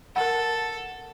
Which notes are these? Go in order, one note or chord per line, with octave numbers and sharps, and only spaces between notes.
A4 A#4 F#5